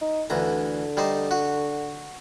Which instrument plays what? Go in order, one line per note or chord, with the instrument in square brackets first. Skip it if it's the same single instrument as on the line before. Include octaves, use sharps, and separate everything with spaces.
[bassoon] D#4
[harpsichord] D2 E3 A#5 [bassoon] D3
[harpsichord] G3 D#4 C5
F#4